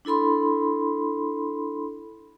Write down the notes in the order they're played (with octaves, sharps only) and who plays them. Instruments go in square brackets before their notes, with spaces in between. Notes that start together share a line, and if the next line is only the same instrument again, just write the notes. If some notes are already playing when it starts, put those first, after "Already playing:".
[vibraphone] D4 E4 A4 B5 C6